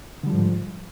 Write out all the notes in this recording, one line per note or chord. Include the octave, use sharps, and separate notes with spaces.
G#2 D3 F3 G3